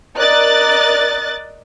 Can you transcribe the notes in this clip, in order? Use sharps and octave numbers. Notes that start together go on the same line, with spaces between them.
A#4 D5 D#5 F#6 A6